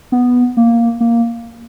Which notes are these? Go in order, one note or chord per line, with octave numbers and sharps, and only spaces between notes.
B3
A#3
A#3